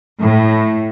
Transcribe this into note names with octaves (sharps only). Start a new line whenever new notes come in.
A2